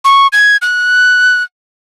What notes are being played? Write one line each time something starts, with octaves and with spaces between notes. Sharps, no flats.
C#6
G#6
F#6